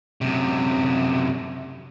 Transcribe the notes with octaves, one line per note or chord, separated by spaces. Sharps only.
F#2 C3